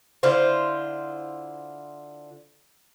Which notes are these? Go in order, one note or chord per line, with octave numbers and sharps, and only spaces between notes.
D3 E4 F4 C5